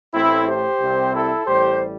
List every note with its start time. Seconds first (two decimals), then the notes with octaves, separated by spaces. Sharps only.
0.14 A1 A2 A3 C4 E4
0.47 G4 C5
0.80 C2 C3 G3 C4
1.14 E4 A4
1.47 A1 A2 G3 G4 C5